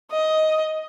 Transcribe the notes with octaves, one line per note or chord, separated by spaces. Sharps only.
D#5